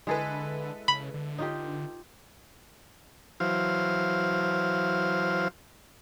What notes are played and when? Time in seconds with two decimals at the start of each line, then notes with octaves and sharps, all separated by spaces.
0.07 D3 G#3 E4 G#4 A4 B4
0.88 C#3 B5
1.14 D3
1.38 D#4 F4 G4
3.40 E3 F#3 C5 F5